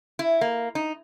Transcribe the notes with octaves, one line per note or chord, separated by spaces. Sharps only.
E4
A#3
D#4